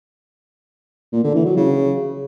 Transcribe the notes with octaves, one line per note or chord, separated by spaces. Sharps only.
A#2
D3
E3
F#3
C#3